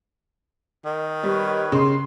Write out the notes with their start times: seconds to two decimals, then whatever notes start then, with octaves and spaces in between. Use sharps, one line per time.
0.86 D#3
1.23 G3 B4 C#5
1.72 C#3 C6